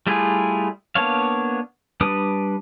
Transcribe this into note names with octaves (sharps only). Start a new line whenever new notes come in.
G3 A3 E4 F4 G#4
A#3 B3 D4 C#5 F5
G3 D4 B4 D#6